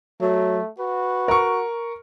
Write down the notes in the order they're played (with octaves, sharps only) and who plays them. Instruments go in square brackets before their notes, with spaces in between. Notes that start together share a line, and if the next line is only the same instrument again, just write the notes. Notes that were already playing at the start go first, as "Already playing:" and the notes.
[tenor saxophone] F#3 [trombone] A3
[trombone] F#4 [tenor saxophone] B4
[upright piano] A#4 C#6